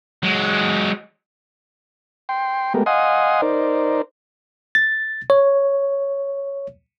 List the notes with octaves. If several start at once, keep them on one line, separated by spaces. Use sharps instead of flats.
F#3 G#3
G5 C6
G#3 A3 B3 G4 A#4
D#5 F5 F#5 G#5 C6 D#6
D#4 A#4 C5 D5
A6
C#5